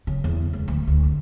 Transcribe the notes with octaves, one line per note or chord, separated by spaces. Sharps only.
C#3
E2
C#2
D2
D2
A1